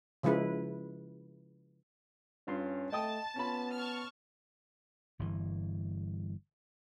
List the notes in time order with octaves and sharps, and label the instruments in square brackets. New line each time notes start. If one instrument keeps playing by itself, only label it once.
[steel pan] C#3 F3 G#3 E4 B4
[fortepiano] G2 F4 C6 [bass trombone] C#4
[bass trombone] A3 [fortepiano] D#5 G5 D#6 [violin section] A5
[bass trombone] B3 [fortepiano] C#4 F4 B5
[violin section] A5 C#6 F6
[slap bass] G1 G2 C#3 E3